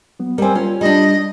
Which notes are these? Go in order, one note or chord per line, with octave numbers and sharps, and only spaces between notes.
F#3 B3
G3 C4 A#4 G#5
C#4 F4
G3 D4 D#5